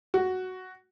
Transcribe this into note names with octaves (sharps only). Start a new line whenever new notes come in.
F#4